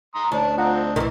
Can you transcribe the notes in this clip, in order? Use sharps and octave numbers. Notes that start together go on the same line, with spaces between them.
A#5 C6 D#6
D2 C#4 D4 A5
C4 D4 F4 D#5 F#5 A#5
B1 D#3 E3